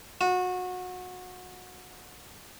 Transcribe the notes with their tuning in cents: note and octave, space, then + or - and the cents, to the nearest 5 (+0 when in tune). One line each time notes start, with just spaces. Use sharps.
F#4 -25